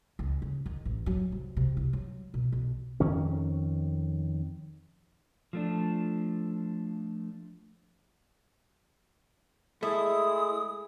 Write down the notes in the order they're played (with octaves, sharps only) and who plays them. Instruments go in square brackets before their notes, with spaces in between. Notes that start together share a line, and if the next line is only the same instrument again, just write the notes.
[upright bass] C#2
C#3
D#3
A1
F#3
C2
C3
E4
F#3
B2
B1
[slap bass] F2 D#3 C#4
[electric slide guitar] F3 A3 D4
[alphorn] G#3 [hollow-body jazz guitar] A3 [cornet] E4 [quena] D#6